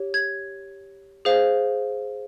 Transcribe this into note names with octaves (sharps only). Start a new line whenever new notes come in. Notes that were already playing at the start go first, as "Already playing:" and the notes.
Already playing: G4 C#5
G#6
G#4 C5 F5